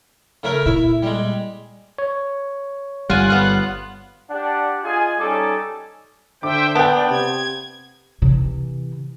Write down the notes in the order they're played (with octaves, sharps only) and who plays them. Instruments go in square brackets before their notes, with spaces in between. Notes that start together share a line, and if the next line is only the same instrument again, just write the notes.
[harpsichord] C#3 A3 A#4
[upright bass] A#2 [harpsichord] E4
[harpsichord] G3 G#3
[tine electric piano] C#5
[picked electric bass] G1 G3 [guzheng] F4 G#5 [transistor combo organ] F#5
[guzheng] B3 F4
[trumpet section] D4 G4 F#5
F4 G#4 D#5 G#5
G3 C#4 D#4 A4 G#5 D6
[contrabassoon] D3 [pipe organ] C5 E5 G5 [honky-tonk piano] D6
[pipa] B3 [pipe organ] D4 [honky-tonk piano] G5 A5
[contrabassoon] C3 [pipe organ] G#6
[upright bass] C3 E3